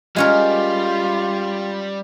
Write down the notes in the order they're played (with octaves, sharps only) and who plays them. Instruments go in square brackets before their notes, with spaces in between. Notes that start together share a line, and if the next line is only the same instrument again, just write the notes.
[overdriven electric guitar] G3 [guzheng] G#3 C#4 A#4 [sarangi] F4